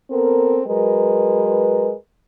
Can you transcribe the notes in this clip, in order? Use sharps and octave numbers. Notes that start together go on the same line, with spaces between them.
B3 C4 A4 A#4
F#3 G#3 A#4 B4